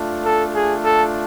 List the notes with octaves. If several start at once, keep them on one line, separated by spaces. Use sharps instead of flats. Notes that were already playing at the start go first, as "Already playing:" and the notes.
Already playing: A3 D4 F4
A4
G#4
A4